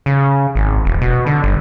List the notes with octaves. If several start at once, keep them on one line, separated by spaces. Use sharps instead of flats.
C#3
G#1
E1
B2
D3
G1